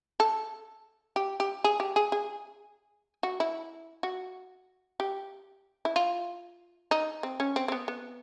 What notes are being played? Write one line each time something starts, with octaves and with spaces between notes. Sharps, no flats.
A4
G4
G4
G#4
G4
G#4
G#4
F#4
E4
F#4
G4
E4
F4
D#4
C4
C#4
C4
C4
B3
B3